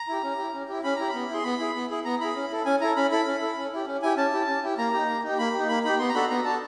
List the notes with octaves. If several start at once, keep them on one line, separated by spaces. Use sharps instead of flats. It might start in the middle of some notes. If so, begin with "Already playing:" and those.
Already playing: A#5
E4 G4
C#4
E4 G4
C#4
E4 G4
C#4 B5
E4 G4 A#5
B5
B3
E4 G#4 C6
B3 B5
E4 G#4
B3
E4 G#4
B3 A#5
E4 G#4 B5
C#4
E4 A4
C#4 G#5
E4 A4 A#5
C#4 B5
E4 A4 B5
C#4
E4 A4
C#4
E4 G4
C#4
E4 G4 G#5
C#4 A5
E4 G4
C#4
E4 G4
A#3 A#5
D#4 G4
A#3
D#4 G4
A#3 B5
D#4 G4
A#3 B5
D#4 G4 B5
B3 C6
A#5
D4 F#4 A4 B5
B3 A#5
D4 F#4 A4 A5